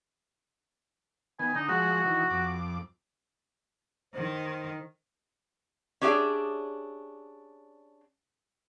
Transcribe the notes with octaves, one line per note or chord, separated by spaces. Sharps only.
D#3 B3 G#5
D3 D#4
F3 G#3 F#4 F#5
D#3 E3
F2 D6
D#3 C5
C#4 D4 G4 G#4 D5 E5